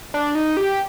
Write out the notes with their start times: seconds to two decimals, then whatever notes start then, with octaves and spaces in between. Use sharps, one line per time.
0.14 D4
0.35 D#4
0.57 G4